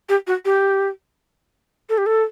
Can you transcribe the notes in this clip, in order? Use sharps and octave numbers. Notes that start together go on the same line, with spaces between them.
G4
F#4
G4
A4
G4
A4